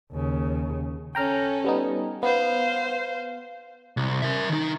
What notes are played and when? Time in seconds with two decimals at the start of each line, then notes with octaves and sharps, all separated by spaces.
0.12 D#2 C#3
1.15 C#4 A4 G5 A#5 F6
1.64 G3 B3 D#4
2.23 B3 C5 F5
3.97 C2
4.22 A#4 E5
4.50 D#3 D#4